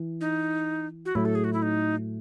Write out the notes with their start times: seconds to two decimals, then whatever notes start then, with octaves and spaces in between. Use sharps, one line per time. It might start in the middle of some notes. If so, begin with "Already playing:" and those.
Already playing: E3
0.21 D#4
1.05 F#4
1.15 A2 F#3 A3 E4
1.25 A4
1.35 G#4
1.44 F#4
1.53 E4
1.62 D#4